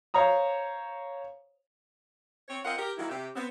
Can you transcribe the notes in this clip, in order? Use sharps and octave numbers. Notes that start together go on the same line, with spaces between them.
C5 C#5 F5 A#5 D#6
C4 C#5
C4 F4 A#4 D#5 F5 F#5
G4 A#4
D#3 F#3 A#3 E4
C3 G4
B3 C4